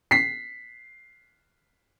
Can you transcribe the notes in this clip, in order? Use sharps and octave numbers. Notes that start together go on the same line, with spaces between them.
B6 C7